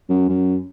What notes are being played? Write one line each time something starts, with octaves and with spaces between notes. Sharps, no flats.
F#2
F#2